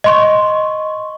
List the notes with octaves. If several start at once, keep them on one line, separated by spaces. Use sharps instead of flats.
D#5 C6 C#6